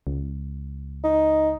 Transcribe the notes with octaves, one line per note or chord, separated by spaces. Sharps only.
C#2
D#4